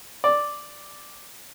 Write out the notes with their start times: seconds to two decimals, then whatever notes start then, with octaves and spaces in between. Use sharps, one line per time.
0.24 D5